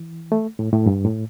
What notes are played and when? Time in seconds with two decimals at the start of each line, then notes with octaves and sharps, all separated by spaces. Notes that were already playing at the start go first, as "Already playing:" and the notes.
Already playing: E3
0.32 A3
0.59 A2
0.73 A2
0.86 G2
1.05 A2